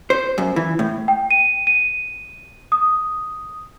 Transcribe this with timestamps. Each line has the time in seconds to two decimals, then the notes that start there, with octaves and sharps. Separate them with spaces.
0.10 C5
0.38 F#2
0.56 E3
0.79 A2
1.08 G5
1.31 D#7
1.67 D#7
2.72 D#6